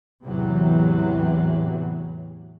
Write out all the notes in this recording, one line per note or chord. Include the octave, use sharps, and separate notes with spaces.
E2 A2 C3 E3 F#3